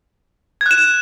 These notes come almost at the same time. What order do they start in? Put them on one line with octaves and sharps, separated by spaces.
G#6 F#6 E7